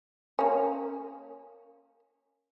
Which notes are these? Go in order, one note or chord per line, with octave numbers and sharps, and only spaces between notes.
A#3 C#4